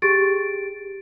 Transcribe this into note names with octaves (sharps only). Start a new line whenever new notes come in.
G4 G#4 A6 D7